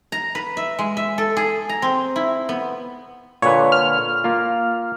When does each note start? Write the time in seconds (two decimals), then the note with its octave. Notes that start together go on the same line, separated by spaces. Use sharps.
0.12 A#5
0.35 B4
0.57 E5
0.79 G#3
0.97 E5
1.18 A4
1.37 G#4
1.69 A#5
1.82 C4
2.16 E4
2.49 B3
3.42 A#2 D3 B4 C#5
3.72 F6
4.24 A#3 F4